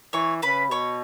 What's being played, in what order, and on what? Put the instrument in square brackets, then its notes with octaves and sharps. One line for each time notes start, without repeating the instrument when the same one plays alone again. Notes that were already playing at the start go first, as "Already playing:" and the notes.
[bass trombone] E3 [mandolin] C#5 C#6
[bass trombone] C#3 [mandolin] B4 B5
[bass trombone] B2 [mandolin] C#5 C#6